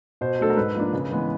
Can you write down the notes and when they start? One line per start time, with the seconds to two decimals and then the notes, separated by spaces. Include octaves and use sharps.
0.21 B2 C5
0.40 F#3 A3 D4 A4
0.50 A#4
0.57 G#2 B4
0.75 F3 A#3 D4
0.93 C#3
1.11 E3 G#3 B3